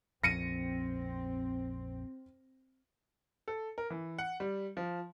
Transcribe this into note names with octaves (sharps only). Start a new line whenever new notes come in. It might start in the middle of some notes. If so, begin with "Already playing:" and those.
A#1 F2 C4 A#6 C#7 D#7
A4
A#4
E3
F#5
G3
F3